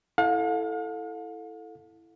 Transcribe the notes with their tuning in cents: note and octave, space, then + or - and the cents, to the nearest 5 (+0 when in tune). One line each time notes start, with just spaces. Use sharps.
E4 +0 A4 +0 F5 +45